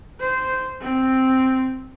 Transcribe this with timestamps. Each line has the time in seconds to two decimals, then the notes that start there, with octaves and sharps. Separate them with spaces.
0.20 C5
0.81 C4